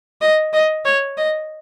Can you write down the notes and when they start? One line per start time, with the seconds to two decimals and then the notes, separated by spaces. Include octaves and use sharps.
0.21 D#5
0.53 D#5
0.85 C#5
1.17 D#5